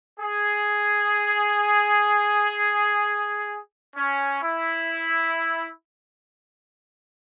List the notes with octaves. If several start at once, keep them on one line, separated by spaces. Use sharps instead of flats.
G#4
C#4
E4